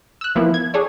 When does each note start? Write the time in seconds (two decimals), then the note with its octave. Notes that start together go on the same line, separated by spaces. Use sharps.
0.21 E6 F#6
0.35 E3 F3 A#3 B3 E4
0.54 G#6
0.74 D4 G#4 A4 C#5 D5